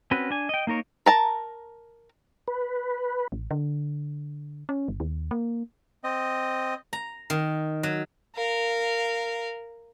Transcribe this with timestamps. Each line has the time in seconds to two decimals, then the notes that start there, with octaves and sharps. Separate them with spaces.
0.11 C4 C#4 F#4 B4
0.31 D4 G#5
0.49 D#5 G5
0.67 A#3 D#4 A#4 C#5
1.06 A#4 A5 A#5
2.48 B4
3.32 A1
3.51 D3
4.69 C#4
4.88 G1
5.00 D#2
5.31 A#3
6.04 C4 D#5
6.93 A#5
7.30 D#3
7.83 F#3
8.36 A#4 F5